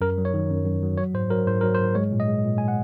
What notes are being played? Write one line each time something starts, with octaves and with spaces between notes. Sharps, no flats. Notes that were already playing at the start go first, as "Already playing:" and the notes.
F#2 A#4
F#3
C#5
D#3
F#2
F#2
F#3
F#3 C#5
G#2 C5
F#3 A#4
G#2 C5
F#3 A#4
C5
G#2
G#3 C#5
A#2
D#5
G#3
A#2
G#3 G#5
F#5